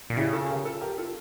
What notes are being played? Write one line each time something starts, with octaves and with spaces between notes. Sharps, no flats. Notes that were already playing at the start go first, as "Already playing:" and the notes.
A#2
C#3 E4 G4
F4 A4
G4 A#4
F4 A4
G4 A#4
F4 A4